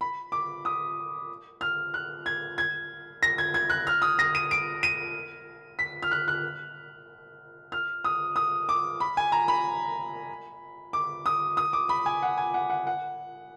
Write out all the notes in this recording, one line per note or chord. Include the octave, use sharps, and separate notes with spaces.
B5
D6
D#6
F6
F#6
G#6
G#6
A#6
G#6
G#6
F#6
F6
D#6
A#6
D#7
D7
D#7
B6
F6
F#6
F#6
F6
D#6
D#6
D6
B5
G#5
A#5
B5
D6
D#6
D#6
D6
B5
G#5
F#5
G#5
F#5
F#5
F#5